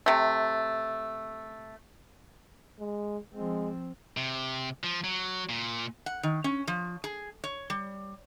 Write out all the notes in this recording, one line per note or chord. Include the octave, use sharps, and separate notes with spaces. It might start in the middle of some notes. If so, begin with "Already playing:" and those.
C3 A3
G#3
F3 G#3 C4
C3
F3
F#3
A#2
F#5
D#3
C#4
F3
G#4
C#5
G3